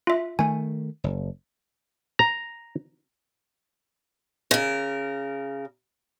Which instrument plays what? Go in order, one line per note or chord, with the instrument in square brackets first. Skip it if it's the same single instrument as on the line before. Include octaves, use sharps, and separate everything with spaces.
[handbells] F4 E5
[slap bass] D#3 A3 [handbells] G#5
[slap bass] F#1
[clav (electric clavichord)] A#5
[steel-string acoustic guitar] C#3 A#4